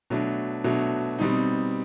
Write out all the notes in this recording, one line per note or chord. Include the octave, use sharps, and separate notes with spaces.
B2 F#3 A3 D4
B2 F#3 A3 D4
B2 G3 C4 D#4